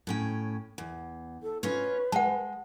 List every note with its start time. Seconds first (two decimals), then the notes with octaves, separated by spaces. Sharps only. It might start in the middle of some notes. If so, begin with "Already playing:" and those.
0.07 A2 C#4 G5
0.78 E2
1.43 A4
1.63 C#4 F4 B4 C#5
2.12 G#3 F#5 A5